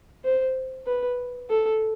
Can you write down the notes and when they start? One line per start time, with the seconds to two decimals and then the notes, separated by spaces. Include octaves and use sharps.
0.24 C5
0.87 B4
1.49 A4